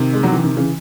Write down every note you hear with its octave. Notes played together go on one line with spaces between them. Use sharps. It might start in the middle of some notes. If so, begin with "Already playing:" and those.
Already playing: C3 D#3
G#3
F#3
E3
C3 D#3
C#3 E3